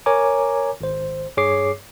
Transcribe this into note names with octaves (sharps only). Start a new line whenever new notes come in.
A#4 C#5 G#5 A#5 D6
G#1 C5
G2 G#4 C#5 D6 C7